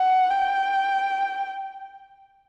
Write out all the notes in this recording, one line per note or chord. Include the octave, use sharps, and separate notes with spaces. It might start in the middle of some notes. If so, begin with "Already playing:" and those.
Already playing: F#5
G5